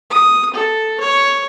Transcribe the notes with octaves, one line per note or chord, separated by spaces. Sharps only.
D#6
A4
C#5